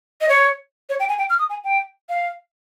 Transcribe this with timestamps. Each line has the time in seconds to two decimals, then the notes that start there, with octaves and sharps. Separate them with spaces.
0.21 D#5
0.29 C#5
0.90 C#5
1.00 G5
1.09 G#5
1.19 G5
1.30 F6
1.39 D#6
1.50 G#5
1.64 G5
2.09 F5